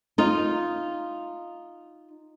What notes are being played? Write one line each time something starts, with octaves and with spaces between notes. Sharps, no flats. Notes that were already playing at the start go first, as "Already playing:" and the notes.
D#4 F4